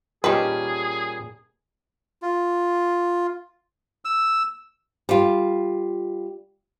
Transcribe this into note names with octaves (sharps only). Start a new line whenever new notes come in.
A#2 G3 C#4 D#4 G4 G#4 B4 A5
F4
E6
G3 F4